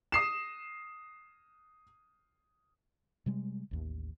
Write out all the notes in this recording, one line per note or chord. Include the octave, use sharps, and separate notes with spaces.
D#6 C7 E7
C3 G3 G#3
A1 D#2